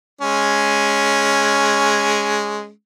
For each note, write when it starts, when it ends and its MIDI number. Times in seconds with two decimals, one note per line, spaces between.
0.21 2.70 56
0.21 2.70 61